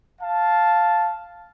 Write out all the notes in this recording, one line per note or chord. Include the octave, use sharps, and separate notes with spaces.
F5 A5